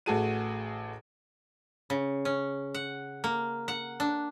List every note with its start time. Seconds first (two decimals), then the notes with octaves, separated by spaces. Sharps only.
0.06 A1 A3 F#4 G#4 A5 D#7
1.90 C#3
2.25 C#4
2.74 F#5
3.24 A#3
3.68 F#5
4.00 D4